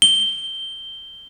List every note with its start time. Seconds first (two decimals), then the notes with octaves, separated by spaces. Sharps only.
0.02 G7